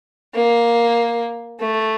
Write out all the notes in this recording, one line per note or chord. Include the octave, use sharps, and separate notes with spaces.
A#3
A3